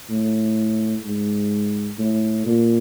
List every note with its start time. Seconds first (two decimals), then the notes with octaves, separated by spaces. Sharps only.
0.10 A2
1.05 G#2
1.99 A2
2.46 A#2